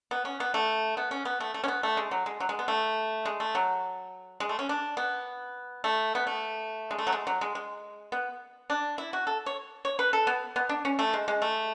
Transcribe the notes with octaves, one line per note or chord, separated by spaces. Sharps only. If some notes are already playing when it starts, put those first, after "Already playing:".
B3
C#4
B3
A3
B3
C#4
B3
A3
A3
C#4
B3
A3
G#3
F#3
G#3
F#3
G#3
B3
A3
G#3
A3
F#3
G#3
A3
C#4
D4
B3
A3
B3
A3
G#3
A3
F#3
G#3
F#3
G#3
G#3
B3
D4
E4
F#4
A4
C#5
C#5
B4
A4
B3
B3
D4
C#4
A3
G#3
G#3
A3